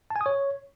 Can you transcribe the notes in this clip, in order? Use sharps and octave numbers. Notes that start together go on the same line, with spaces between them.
A5
G#5
D#6
C#5